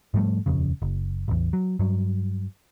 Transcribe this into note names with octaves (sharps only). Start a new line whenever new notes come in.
G#2 F3 G3 A3
D#1 F2 C#3
F#1
A1 E2
F#3
G2 F#3